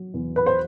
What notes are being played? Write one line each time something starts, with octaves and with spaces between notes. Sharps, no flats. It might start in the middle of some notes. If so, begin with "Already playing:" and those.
Already playing: F#3
E2
B4
C5